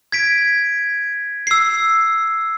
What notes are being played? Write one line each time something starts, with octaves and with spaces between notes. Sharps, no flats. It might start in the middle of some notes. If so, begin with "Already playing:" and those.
G#6 B6 D7
E6 C7